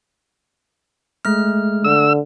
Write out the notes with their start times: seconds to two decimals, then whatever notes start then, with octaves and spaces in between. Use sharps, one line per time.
1.25 G#3 A3 F6
1.84 D3 E6